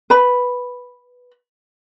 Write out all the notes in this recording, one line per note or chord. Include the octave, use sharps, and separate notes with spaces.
B4 B5